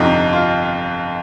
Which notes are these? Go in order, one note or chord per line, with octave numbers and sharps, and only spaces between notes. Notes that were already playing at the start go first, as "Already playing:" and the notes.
Already playing: G1 F2 C3 F3 D#4
F4